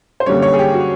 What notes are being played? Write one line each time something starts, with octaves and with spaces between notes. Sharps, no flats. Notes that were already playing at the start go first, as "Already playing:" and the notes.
C5
F#2 D3 G3 A#3 C#5
C#5
G#4
G4
F#4